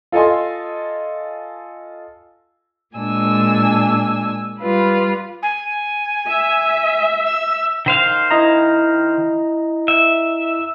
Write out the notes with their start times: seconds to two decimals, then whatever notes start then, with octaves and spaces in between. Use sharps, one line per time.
0.12 F4 A4 D#5 G#5 C6
2.97 A#2 G#3 D4 G#5 E6
4.60 G3 F4 B4
5.43 G#5
6.28 E5
7.26 E6
7.86 D#3 C5 F5
8.31 E4 D#5 A#5
9.88 E5